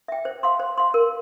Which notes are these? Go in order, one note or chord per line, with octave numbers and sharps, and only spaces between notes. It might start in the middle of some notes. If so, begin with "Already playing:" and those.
E5 G5
C5
F5 C6
C5
F5 C6
A#4